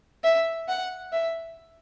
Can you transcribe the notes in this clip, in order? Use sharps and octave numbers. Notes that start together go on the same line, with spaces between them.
E5
F#5
E5